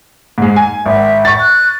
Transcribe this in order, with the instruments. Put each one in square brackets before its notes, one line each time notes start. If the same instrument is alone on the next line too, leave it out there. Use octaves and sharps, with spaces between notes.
[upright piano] G#2 G#3
G#5
[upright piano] G#1 [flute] E5
[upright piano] C#6 A6
[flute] F#6